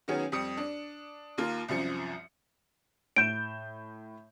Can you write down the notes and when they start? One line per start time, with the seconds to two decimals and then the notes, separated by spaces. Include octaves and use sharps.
0.08 D#3 F#3 B3 C#4 G#4
0.32 F2 G3 G4 D#6 C#7
0.57 D4
1.38 D#2 A#3 F4
1.68 C2 F#2 F3 C#7
3.16 A2 G6 D7 E7